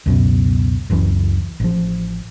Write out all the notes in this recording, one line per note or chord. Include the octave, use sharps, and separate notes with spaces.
C#2 F#2 B2
F#1 C#2 F#2 E3
A1 F3